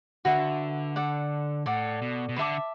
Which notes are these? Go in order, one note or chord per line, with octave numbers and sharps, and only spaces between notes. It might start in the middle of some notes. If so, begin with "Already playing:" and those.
D3 F#4 B4 E5
A4 D5 F#5
A2 A4 D5 F#5
B2
B2
D3 B4 E5 A5 D6